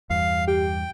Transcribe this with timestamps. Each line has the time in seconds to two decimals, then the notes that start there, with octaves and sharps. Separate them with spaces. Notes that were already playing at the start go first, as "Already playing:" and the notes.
0.10 E2 G2 F5
0.47 G4 G5